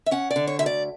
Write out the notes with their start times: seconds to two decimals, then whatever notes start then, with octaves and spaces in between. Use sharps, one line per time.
0.06 E5
0.11 C#4 F#5
0.31 D5
0.36 D3
0.47 C#5
0.59 D2 E5
0.66 D5